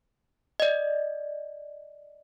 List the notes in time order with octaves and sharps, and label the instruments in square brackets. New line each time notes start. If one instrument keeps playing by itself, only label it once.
[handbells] D5 D#5